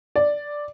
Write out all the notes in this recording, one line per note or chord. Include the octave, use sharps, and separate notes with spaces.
D5